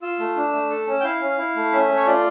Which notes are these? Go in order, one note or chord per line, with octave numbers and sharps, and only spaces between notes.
F4 E6
A3
D4
A3
A4
C#4
G5
E4 F5
C#4
E4
A3
C#4 E5
A3
C#5
F4 D5